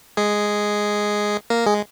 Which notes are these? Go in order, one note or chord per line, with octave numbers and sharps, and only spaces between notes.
G#3 G#4
A#3 A#4
G#3 G#4